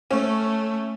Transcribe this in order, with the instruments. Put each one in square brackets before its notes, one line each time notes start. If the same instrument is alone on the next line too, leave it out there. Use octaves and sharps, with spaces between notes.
[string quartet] A3 [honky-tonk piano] C#4